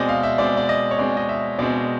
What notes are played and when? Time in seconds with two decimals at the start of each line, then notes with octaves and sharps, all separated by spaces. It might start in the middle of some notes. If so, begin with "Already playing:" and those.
Already playing: B2 G#3 C4 D5 D#5
0.09 F5
0.23 E5
0.38 B2 G#3 C4 D5
0.57 D5
0.69 D#5
0.91 C#5
0.98 B2 G#3 C4 D5
1.17 D#5
1.29 E5
1.59 B2 G#3 C4 D5